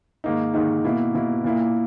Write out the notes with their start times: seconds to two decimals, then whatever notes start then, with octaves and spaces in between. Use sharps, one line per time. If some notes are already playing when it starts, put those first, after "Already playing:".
0.24 G#2 D#3 A#3 D#4
0.54 G#2 D#3 A#3 D#4
0.85 B2 A#3 E4
1.15 B2 A#3 E4
1.44 A#2 A#3 E4